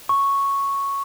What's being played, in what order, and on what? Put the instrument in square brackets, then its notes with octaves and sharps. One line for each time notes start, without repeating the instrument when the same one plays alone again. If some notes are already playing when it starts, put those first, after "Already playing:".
[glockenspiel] C#6